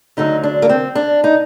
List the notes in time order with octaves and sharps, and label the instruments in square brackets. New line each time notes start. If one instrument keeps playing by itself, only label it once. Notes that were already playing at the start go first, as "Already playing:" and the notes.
[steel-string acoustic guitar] D2 D3 F#3 D#4
D4
A#3
C4
D4
D#4